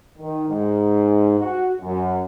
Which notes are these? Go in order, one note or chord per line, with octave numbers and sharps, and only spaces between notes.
D#3
G#2
F#4
F#2